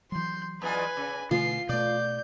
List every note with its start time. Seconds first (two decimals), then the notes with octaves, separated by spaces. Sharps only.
0.12 E3 F#3 C6 G6
0.62 E2 F4 B4 D#5 G#5
0.97 C#3
1.31 B2 D3 E3 A3 F4 C7
1.69 B2 A3 D5 G6